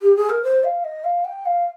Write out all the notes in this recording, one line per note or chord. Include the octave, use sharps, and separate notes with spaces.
G4
G#4
A#4
C5
F5
D#5
F5
G5
F5